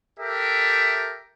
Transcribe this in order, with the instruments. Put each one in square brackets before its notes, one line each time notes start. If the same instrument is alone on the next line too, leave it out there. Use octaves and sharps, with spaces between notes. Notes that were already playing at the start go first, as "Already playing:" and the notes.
[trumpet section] G4 A4 A#4 E5